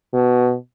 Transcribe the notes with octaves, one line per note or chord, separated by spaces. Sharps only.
B2